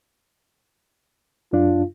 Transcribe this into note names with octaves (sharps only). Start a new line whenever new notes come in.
F#2 D4 F4